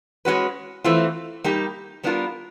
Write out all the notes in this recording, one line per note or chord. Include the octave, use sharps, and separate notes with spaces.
G#3 C#4 F#4 B4
E3 A3 C4 F4
G3 A#3 D#4 G4
G3 B3 D4 F4 A#4